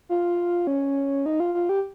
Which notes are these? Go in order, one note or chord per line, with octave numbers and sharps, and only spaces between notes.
F4
C#4
D#4
F4
F4
G4